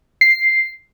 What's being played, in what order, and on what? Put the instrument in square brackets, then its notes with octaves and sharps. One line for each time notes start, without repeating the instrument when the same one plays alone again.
[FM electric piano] C7